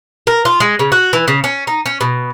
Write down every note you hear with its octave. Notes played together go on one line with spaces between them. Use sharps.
A#4
F4
G#3
C#3
F#4
E3
C#3
C#4
D#4
C#4
B2